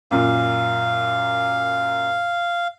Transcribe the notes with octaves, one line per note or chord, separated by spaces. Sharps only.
F#2 A#2 F5